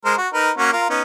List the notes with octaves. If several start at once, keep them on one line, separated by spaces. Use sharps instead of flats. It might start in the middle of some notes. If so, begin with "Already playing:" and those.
G#3 A#4 C5
F#4
D#4 A#4 B4
A#3 C#4 F#4
F4 A#4
B3 C#4 D#4